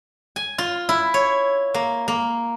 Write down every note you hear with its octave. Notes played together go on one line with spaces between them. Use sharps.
G#5
F4
E4
C#5
A#3
A#3